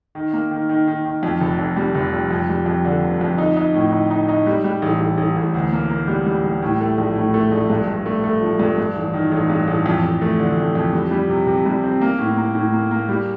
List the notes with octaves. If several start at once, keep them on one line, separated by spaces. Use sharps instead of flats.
D#3
A#3
D#3
D#3
D#3
D#3
F2
F1
F2
G3
F1
F2
F2
G3
F2
D3
G1
F2
D#4
D#4
A2
D#4
D#4
D#4
G3
G3
A1
A1
A1
A1
D2
A#3
A#3
G3
G3
G3
A2
A3
A#1
A2
A3
A#1
G2
G2
A3
A3
F3
G2
G2
A1
D#3
A1
G2
A1
F2
F2
A3
D3
F2
F2
G3
G3
C3
C3
G3
C4
A#3
A2
A#3
A2
A#3
A#3
G3